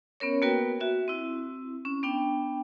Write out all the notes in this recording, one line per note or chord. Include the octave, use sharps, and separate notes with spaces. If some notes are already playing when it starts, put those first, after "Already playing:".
B3 C#4 A#4 C#5
A#3 B3 F#4 A#4 B4 G5
F#4 E5
C4 E4
C#4
B3 D4 G5